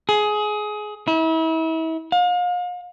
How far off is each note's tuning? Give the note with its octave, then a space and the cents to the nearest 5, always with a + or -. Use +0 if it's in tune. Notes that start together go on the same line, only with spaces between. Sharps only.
G#4 +20
E4 -35
F5 +40